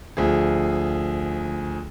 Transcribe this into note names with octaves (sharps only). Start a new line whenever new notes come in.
D2 F3 G#4